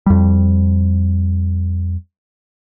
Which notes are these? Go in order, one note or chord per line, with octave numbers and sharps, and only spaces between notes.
F2 G3